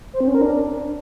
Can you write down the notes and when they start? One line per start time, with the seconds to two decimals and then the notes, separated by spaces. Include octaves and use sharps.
0.13 C5
0.20 C4
0.27 C#4
0.35 A#4
0.42 D4